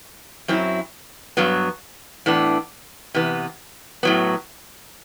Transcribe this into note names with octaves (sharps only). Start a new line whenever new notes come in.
F#2 F#3 C4 E4
G2 F#3 B3
A2 E3 B3 D4
C3 E3 B3
A2 F#3 B3